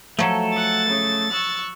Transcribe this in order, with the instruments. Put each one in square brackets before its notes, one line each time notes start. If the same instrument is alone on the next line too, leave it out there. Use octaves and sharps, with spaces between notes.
[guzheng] F3 F#3 [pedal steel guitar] A3 A4
[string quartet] F#5 [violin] A6
[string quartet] C#3
C#6 E6 F#6